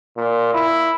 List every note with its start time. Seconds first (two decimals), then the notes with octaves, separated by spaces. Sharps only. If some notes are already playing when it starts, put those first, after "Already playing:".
0.17 A#2
0.53 E4